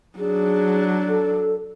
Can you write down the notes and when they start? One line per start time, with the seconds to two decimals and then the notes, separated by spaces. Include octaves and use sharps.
0.19 F#3 D4 G#4
1.08 A4